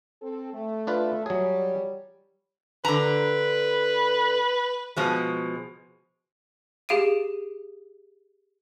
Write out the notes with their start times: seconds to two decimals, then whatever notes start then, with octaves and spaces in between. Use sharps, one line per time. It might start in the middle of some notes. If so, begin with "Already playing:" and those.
0.22 C4 A4
0.54 A3
0.87 D4 F4 B4
1.26 F#3 G3 G#4 C#5
2.85 D3 B4 A#5
4.96 B2 F3 G#3
6.89 G4 G#4 F5 D7 D#7